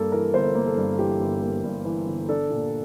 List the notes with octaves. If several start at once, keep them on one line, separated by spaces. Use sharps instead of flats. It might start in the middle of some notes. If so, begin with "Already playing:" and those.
Already playing: G2 A#3 A4
E3 A#4
G1 C5
A#3
A4
G2
E3 G4
G1
A#3
G2
E3
G1
D4 A4
A#2